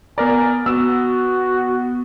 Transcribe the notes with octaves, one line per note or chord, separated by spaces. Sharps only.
B3 A#4 D5 G#5 A#5
B3 F#4 E6